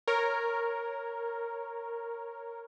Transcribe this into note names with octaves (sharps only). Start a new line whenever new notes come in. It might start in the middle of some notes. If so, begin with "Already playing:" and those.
A#4 C#5